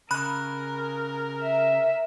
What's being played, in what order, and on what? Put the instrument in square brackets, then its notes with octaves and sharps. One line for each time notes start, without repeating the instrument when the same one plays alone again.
[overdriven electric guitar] C#3 [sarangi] A#4 [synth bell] B5 F#6
[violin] E5